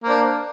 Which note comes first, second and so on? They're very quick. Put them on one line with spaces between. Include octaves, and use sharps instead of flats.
A#3 C5 D4